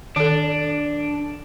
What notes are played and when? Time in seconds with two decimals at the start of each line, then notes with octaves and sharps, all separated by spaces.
0.16 D#3 D4 A4